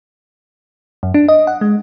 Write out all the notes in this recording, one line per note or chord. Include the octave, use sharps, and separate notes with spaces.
F#2
D4
D#5
F#5
G#3